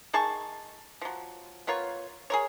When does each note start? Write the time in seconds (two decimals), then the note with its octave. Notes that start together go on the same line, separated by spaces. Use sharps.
0.13 D#3 G#4 A5 C#6
1.01 F3 F#3
1.67 B3 F4 A#4 C#5
2.30 G#4 A#4 C#5